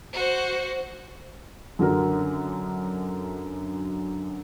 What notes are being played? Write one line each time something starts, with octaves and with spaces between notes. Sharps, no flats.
F#4 C5
F#2 D3 F#4 A#4